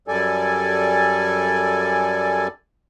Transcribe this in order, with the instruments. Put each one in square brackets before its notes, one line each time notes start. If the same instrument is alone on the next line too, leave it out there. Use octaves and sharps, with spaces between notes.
[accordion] F#2 G3 A4 D5 G#5